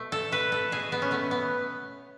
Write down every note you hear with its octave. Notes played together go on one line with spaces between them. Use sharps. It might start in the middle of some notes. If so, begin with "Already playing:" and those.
Already playing: B2 A3
A4
A3 B4
A4
B2 G#4
B3
C#4
A3 B3
B3